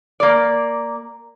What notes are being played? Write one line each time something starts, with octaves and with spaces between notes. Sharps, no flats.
A#3 D5